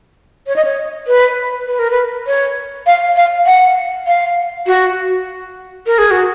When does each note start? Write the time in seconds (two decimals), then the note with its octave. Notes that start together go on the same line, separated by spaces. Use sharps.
0.47 C#5
0.56 D#5
0.65 C#5
1.07 B4
1.67 B4
1.79 A#4
1.90 B4
2.27 C#5
2.87 F5
3.16 F5
3.46 F#5
4.07 F5
4.67 F#4
5.86 A#4
5.98 G#4
6.11 F#4